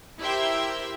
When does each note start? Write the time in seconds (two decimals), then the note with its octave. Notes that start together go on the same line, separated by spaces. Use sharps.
0.21 E4 G4 A#4 C5 E5 G5